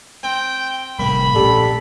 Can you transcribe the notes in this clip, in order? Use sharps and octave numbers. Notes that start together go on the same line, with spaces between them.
C4 G5
A2 C3 G3 A#3 B5
A#2 G3 A3 C#4 A4